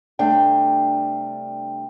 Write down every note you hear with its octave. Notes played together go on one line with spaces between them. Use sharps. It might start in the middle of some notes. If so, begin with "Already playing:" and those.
C3 G3 A3 D4 G5